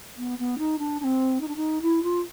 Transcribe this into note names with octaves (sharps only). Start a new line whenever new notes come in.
B3
B3
D#4
D4
D4
C4
D#4
D4
D#4
E4
F4